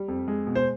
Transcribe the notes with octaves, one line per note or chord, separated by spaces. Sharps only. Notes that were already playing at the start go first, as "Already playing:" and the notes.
Already playing: G3
F2
G#3
B2
C5